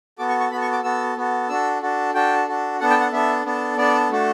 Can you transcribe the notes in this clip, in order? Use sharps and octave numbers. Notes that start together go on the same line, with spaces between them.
B3 F#4 A4 D6
C#6
C#6
B3 F#4 A4 B5
C#6
D6
B3 F#4 A4 E6
B3 F#4 A4
D4 F#4 A4 E6
D4 F#4 A4
D4 F#4 A4 G5
D4 F#4 A4
B3 D4 A4 F#5
G5
F#5
B3 D4 A4 E5
B3 D4 A4
B3 D4 A4 D5
A3 D4 F#4 A4